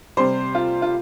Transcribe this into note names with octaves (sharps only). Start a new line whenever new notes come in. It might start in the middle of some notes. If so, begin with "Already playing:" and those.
C3 G3 C5
F4
F4